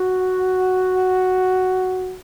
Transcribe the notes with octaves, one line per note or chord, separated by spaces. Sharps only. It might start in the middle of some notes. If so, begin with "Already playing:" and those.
Already playing: F#4